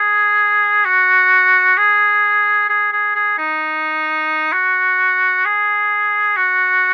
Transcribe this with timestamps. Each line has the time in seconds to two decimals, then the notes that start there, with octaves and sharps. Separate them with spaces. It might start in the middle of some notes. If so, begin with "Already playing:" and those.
Already playing: G#4
0.85 F#4
1.78 G#4
2.69 G#4
2.92 G#4
3.15 G#4
3.38 D#4
4.53 F#4
5.45 G#4
6.36 F#4